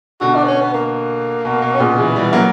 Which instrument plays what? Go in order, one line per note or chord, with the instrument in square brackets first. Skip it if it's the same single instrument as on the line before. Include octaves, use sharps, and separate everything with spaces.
[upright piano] B2 D3 [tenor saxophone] F#4
[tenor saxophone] D4
B3
C#4
B3
A#3
[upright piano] B2
B2
[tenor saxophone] C#4
[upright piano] A#2 C#3 [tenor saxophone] B3
[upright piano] C#3 E3
E3 G3
F#3 A#3